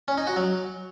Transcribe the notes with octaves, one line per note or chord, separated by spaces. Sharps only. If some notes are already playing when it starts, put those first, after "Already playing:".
C#4
D#4
F#4
F#3